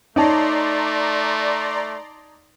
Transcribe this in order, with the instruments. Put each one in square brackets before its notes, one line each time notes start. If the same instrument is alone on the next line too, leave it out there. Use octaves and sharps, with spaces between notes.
[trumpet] A3 [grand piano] D#4 C#5 A5 [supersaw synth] D5 A#5 C6